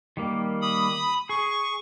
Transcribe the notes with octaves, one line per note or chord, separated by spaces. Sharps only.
D#3 G3 A#3
B5 D#6
G#4 C#6